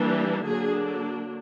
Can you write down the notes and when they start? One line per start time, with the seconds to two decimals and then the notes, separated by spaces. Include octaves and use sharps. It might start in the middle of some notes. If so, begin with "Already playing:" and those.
Already playing: E3 G3 A#3 D4
0.45 D3 F#3 A#3 D4 G#4